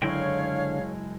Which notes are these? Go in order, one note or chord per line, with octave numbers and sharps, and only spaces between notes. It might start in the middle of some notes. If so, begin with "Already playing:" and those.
F#1 D3 G#3 E4 C#5 F5 G5 G#6